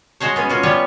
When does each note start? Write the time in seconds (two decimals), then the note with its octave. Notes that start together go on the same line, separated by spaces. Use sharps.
0.20 G#3 F#4 C5 C#5
0.36 B3 C#4
0.49 C#4 F4 F#4
0.63 G3 B3 G4 B4 C#5